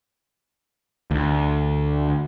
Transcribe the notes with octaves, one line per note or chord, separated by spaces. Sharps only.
D2